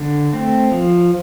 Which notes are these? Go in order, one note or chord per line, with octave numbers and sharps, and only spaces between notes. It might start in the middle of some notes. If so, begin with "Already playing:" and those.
Already playing: D3
A3 C4
F3